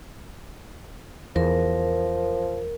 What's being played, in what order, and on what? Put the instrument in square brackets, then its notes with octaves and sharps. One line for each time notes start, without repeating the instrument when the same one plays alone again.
[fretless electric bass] E2 [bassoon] F3 [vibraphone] A#4